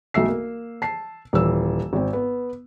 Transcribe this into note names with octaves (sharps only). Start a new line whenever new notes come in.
B1 A3 E5 E6 C7
A#3
A5 C7
D#1 E3 E6
G#1 C4
B3